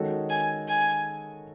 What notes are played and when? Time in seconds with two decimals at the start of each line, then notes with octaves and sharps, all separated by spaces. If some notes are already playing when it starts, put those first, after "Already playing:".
Already playing: D#3 G#3 C#4 F#4 A4
0.30 G#5
0.68 G#5